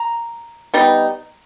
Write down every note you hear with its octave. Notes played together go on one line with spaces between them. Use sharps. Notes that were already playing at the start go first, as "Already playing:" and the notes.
Already playing: A#5
G3 B3 D#4